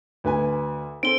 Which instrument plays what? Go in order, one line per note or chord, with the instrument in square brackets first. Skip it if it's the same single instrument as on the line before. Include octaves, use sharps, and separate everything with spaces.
[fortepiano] D2 B4 G#5
[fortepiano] C4 A4 [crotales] D7 G7